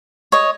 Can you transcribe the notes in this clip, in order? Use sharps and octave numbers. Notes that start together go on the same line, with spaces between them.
C#5 D#5